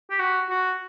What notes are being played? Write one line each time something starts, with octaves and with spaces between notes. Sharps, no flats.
G4
F#4
F#4